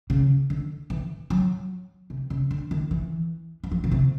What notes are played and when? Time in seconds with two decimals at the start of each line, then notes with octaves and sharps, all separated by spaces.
0.10 C#3
0.50 D3
0.90 E3
1.30 F#3
2.10 C3
2.30 C#3
2.51 D3
2.71 D#3
2.91 E3
3.64 E3
3.71 F3
3.84 C#3
3.91 C3